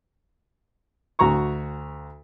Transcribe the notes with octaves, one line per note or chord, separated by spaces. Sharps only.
D2 F#4 A#5 C#6